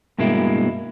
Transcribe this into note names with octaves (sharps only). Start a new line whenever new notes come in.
G2 B2 G#3 A#3 E4